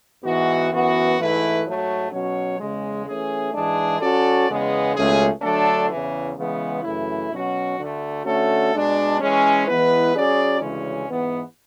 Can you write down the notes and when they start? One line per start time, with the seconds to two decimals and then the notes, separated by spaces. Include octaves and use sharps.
0.23 G#2 E3 B3 F#4
0.70 F#2 E3 B3 F#4
1.18 G#2 E3 A3 E4 B4
1.64 G#2 F#3 A3
2.11 B2 F#3 C#4 F#4 C#5
2.58 E2 C#3 G#3
3.06 E3 A3 C#4 G#4
3.53 G#2 E3 G#3 D4 G#4
4.00 F#3 C#4 F#4 A4 D5
4.47 E2 C#3 G#3 B3
4.94 C#2 B2 A3 C#4 G#4
5.41 D3 F#3 A3 D4 A4
5.89 E2 C#3 E3
6.36 C#3 E3 G#3 B3
6.83 F#2 C#3 E3 A3 E4
7.30 B2 F#3 C#4 F#4
7.77 D2 D3 A3
8.24 D3 A3 C#4 F#4 A4
8.72 B2 G#3 D4
9.19 E3 G#3 C#4
9.65 E3 G#3 B3 E4 B4
10.14 F#3 C#4 G#4 D5
10.60 D2 C#3 E3 G#3 C#4
11.07 G#2 E3 B3